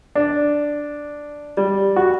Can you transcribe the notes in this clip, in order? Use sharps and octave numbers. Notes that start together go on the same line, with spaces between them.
D4
G3
F#4